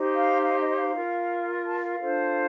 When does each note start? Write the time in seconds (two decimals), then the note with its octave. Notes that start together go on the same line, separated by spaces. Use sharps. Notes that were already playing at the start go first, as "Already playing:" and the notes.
Already playing: D#4 G4 C5
0.16 F5
0.42 F5
0.60 D#5
0.77 F5
0.95 F4 A#4
1.65 A5
1.82 F5
2.00 D4 F4 A4 C5